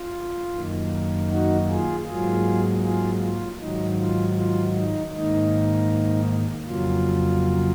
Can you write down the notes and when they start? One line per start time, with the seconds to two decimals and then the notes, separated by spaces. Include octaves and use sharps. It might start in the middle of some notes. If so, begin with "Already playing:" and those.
Already playing: F4
0.54 F#2 D#3 A#3
1.30 D#4 F#4
1.69 F4 G#4
2.07 G#2 F#3 A#3 F4 G#4
2.84 F4 G#4
3.21 F4
3.60 G#2 D#3 F#3 D#4
3.98 F4
4.36 F4
4.76 D#4
5.13 G#2 D#3 A#3 D#4
6.67 F2 C#3 F#3 A#3 F4